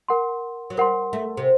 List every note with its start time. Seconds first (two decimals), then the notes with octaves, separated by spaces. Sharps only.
0.08 A#4 F#5 C6
0.70 F#3
0.77 G3 A#4 F#5 C6
1.13 A3
1.37 C3